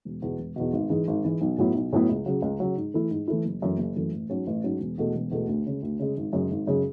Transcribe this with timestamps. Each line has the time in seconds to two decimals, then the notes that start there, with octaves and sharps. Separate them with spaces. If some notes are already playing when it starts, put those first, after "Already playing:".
0.05 E1
0.22 E2 B2
0.39 E1
0.56 E2 B2
0.73 G#1
0.90 G#2 E3 G#3
1.08 G#1
1.25 G#2 E3 G#3
1.41 B1
1.58 A2 F#3 B3 E4
1.75 B1
1.93 A2 F#3 B3 E4
2.09 C#2
2.26 C#3 F#3
2.42 C#2
2.60 C#3 F#3
2.77 G#2
2.94 E3 A3 E4
3.11 G#2
3.28 E3 A3 E4
3.45 F#1
3.62 F#2 E3 A3
3.78 F#1
3.96 F#2 E3 A3
4.12 A1
4.29 G#2 F#3 C#4
4.47 A1
4.64 G#2 F#3 C#4
4.80 E1
4.98 E2 B2 A3
5.15 E1
5.31 E2 B2 A3
5.48 D2
5.66 C#3 G#3
5.82 D2
6.00 C#3 G#3
6.17 G#1
6.33 F#2 C#3 G#3
6.51 G#1
6.67 F#2 C#3 G#3